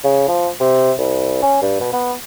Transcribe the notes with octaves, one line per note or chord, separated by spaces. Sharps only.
C#3
F3
C3
C2
C#4
G2
B2
B3